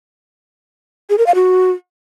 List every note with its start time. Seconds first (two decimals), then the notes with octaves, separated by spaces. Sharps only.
1.10 G#4
1.18 A#4
1.26 F5
1.35 F#4